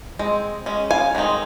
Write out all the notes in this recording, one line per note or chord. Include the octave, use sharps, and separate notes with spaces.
G#3 C4
G#3 C#4
F5 G#5
D#3 G#3 C4 D#4